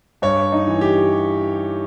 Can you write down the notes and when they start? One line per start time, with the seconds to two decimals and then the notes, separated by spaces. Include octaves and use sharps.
0.22 G2 C#5
0.52 D#4
0.67 E3
0.81 G4